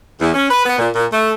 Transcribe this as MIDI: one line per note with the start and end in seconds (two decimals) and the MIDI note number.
0.21 0.32 40
0.34 0.46 61
0.50 0.65 71
0.66 0.76 59
0.78 0.90 46
0.95 1.06 46
1.12 1.32 57